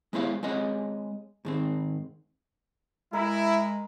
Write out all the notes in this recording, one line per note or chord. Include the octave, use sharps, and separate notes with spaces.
G#3 B3 E4 C5 C#5 F5
G#3 C4 G#4 C#5 D#5 F#5
G#2 D#3 C4
G#3 E4 A#4